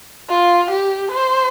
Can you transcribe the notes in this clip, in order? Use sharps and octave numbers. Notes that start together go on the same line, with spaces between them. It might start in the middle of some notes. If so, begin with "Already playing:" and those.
F4
G4
C5